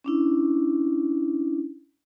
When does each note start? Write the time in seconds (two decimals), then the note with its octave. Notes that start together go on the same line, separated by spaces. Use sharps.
0.04 C#4 D4 E4